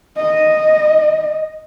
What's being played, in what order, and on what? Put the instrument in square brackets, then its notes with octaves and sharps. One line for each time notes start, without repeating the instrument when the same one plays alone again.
[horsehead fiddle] D#5